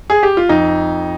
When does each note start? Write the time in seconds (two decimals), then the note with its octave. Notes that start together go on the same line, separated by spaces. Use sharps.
0.10 G#4
0.23 G4
0.37 F4
0.49 F2 D#4